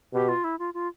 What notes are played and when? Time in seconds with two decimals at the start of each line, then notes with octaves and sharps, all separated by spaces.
0.13 B2 G4
0.29 F4
0.44 E4
0.59 F4
0.74 F4